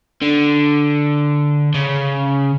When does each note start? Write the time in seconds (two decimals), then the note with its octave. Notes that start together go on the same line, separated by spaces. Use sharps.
0.22 D3
1.74 C#3